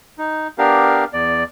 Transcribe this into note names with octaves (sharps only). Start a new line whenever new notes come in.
D#4
B3 D4 G4 A#4 F5
E2 D5